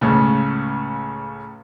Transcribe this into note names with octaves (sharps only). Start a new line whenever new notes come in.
C#2 A2 C#3